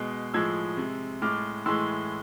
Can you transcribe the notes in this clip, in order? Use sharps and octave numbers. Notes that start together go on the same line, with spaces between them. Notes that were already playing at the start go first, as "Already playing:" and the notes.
Already playing: B2 G#3
A2 F3 G#3 E6 G#6
C3 G#3
A2 G#3 D6 F6
A2 E3 G#3 C6 E6